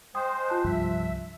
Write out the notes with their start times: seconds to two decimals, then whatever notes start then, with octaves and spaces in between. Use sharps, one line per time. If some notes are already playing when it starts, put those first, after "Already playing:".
0.15 G#3 C5 G5 D#6
0.48 F4 A5 F#6
0.64 C2 G2 F3 E5